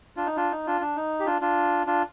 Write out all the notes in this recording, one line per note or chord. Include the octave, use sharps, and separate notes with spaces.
D4 F4
D#4
D4 F4
D#4
D4 F4
D4
D#4
G4
D4 F4
D4 F4
D4 F4